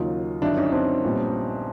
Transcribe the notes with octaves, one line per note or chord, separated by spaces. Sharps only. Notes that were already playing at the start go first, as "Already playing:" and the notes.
Already playing: D#2 C#3 F#3 A#3 D#4 F4
G1 G2 D#3 F#3 D4 E4
C#4 D#4
C4 D4
A#1 A#2 G3 B3 D#4